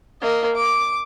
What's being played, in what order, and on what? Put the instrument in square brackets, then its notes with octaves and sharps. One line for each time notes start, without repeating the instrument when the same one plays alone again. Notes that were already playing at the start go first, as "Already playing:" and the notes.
[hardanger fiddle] A#3 D#5
D6